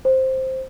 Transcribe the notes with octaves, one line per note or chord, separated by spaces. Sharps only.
C5